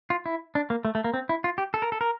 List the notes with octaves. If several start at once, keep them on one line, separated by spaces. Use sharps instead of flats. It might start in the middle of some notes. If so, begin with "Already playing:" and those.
F4
E4
D4
A#3
A3
A3
A#3
C4
E4
F4
G4
A4
A#4
A4
A#4